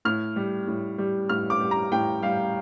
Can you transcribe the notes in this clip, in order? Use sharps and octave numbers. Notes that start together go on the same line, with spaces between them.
A2 F6
G3
A2
G3
A2 F6
D6
G3
A#5
A2 G5
G3 F5